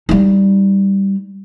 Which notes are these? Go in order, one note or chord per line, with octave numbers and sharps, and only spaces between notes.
G3 D#4